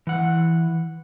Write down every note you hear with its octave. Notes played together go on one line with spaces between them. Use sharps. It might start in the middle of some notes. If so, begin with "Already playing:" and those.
E3 F#5